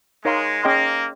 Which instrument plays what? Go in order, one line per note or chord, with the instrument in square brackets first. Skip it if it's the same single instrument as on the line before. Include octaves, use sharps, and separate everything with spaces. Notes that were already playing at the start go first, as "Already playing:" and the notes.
[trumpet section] G#3 [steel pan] D#4 A#4 C#5 F5 C6
[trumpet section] A#3 [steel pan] C#4 G#4 D#5 G5 C6